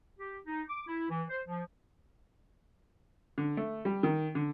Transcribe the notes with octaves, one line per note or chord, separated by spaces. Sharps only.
G4
D#4
D6
E4
E3
C5
F3
D3
A3
G3
D#3
D3